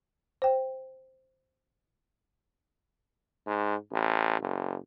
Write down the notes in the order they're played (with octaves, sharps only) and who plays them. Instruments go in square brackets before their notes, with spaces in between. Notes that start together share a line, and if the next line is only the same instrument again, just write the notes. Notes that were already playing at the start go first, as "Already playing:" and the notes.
[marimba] C5 G5
[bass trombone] G#2
A1
F#1